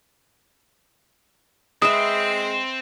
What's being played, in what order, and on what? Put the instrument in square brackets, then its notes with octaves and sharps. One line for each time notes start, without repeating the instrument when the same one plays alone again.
[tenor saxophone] G#3 [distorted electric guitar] C4 [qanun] B4 E5 [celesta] D#6